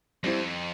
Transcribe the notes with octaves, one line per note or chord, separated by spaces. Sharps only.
F2 G3 C4 E4